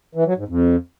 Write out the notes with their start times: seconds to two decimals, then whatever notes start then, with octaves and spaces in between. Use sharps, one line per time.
0.15 E3
0.26 F#3
0.37 G#2
0.48 F2